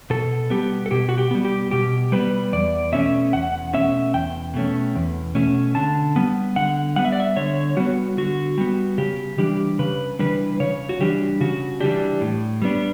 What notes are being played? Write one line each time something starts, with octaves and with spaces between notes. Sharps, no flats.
B2 A4
G3 B3 G4
A4
B2 G4
F#4
G4
G3 B3
G4
B2 G4
G3 B3 B4
E2 D5
B2 A3 C#4 E5
E2 F#5
B2 A3 C#4 E5
E2 G5
B2 A3 C#4
E2
B2 A3 C#4
D3 A5
G3 B3
D3 F#5
G3 B3 F#5
E5
D5
E5
D3 C#5
G3 B3 F#4
D3 F#4
G3 B3
C#3 G4
E3 G3 D4 G4
C#3 B4
E3 G3 D4 B4
C#3 C#5
F#4
E3 G3 D4 G4
C#3 F#4
E3 G3 D4 G4
A2
G3 B3 D4